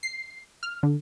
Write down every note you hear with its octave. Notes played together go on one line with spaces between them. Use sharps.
C7
F6
D3